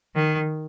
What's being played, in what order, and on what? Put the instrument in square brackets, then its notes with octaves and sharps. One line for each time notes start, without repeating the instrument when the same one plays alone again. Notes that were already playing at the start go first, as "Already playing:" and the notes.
[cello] D#3